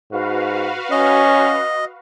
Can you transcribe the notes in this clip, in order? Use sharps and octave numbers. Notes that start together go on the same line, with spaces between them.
G#2 F#4 B4 F5
C#4 D#5